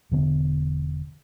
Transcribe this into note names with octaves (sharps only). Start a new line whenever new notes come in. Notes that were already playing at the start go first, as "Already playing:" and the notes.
E1 D3 B3 D4